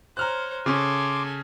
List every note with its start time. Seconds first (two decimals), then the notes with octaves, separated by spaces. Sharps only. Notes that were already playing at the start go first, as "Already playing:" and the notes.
0.17 C5 C#5 A#5 F6 F#6
0.66 C#3 C#4 A4 G#5 C6 D6